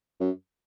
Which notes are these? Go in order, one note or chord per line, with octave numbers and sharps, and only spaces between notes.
F#2